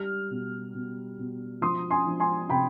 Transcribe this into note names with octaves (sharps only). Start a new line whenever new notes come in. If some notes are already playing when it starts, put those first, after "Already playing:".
Already playing: G3 F6
B2
B2
B2
F3 C6 D#6
G#5 C6
F3
G#5 C6
C3 G5 B5